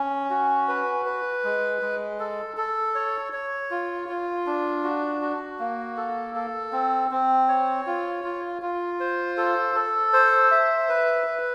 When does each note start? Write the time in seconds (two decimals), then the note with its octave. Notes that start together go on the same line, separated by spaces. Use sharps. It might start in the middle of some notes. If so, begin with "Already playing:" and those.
Already playing: C#4
0.30 F#4
0.68 B4
1.06 B4
1.44 G#3
1.82 G#3
2.20 A4
2.57 A4
2.95 C#5
3.33 C#5
3.71 F4
4.09 F4
4.46 D4
4.84 F#4
5.22 F#4
5.59 A#3
5.97 A4
6.35 A4
6.73 C4
7.11 C4
7.49 C#5
7.87 F4
8.24 F4
8.62 F4
9.00 C5
9.37 A4
9.75 A4
10.13 C5
10.51 E5
10.89 B4
11.27 B4